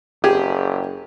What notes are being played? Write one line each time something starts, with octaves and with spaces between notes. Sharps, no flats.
F#1 G4 G#4